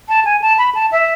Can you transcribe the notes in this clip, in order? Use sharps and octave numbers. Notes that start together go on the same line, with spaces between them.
A5
G#5
A5
B5
A5
E5